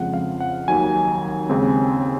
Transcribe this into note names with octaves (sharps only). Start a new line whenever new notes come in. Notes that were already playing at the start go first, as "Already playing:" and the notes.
Already playing: F2 C#3 F3 G#3 C4 F#5
F5
F#5
D#2 D#3 F#3 G#5
D#2 C#3 G#3 C4